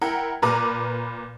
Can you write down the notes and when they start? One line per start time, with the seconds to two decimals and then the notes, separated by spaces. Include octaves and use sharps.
0.01 E4 A#4 F#5 G5
0.42 A#2 A#4 B4 A#5 D6